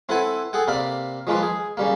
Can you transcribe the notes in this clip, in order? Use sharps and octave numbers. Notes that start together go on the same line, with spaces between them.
C4 E4 A4 B4 F#5 G#5
G#4 A4 F#5 G5
C3 A#3 D5 F5 B5
F3 G#3 A#3 F4 B4
G#4
C#3 G3 A#3